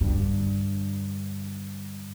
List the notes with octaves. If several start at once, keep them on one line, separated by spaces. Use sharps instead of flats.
G2 D3